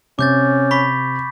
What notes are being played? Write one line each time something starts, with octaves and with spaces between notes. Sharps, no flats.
C3 C#4 D6 G6 A6
B5 C#6 B6